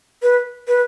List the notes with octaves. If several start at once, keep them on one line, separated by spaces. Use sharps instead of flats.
B4
B4